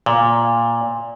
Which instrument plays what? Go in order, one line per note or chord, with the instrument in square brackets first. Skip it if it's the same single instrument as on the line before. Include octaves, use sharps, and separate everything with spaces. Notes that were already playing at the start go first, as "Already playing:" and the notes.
[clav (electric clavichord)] A#2